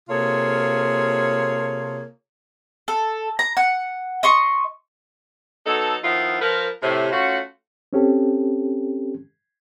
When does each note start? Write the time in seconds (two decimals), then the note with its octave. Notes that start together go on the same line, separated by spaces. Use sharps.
0.09 C3 A#3 F4 G#4 A4 C#5
2.88 A4
3.39 A#5
3.57 F#5
4.23 D#5 C6 C#6
5.66 F#3 B3 D#4 A4
6.04 D#3 F3 B3 E4 F4
6.41 F3 A#4 B4
6.82 A2 C3
7.12 A3 C#4 F4 F#4
7.93 C4 C#4 G4 A4